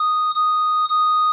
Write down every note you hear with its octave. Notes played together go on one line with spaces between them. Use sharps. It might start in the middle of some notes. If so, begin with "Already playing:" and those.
Already playing: D#6
D#6
D#6